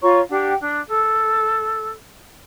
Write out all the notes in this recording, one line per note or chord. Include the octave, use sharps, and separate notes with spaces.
F4 C#5 A#5 C#6
D4 G4 F#5 G5
D4
A4